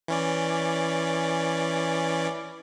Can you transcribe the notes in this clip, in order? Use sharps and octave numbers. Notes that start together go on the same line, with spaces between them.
E3 C#4 D5